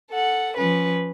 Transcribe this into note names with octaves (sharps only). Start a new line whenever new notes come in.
A4 F#5
F3 C#4 B4